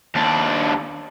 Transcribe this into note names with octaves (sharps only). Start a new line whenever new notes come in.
D#2 D4